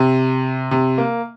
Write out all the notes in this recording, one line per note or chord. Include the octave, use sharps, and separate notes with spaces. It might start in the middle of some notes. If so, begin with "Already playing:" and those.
Already playing: C3
C3
A#3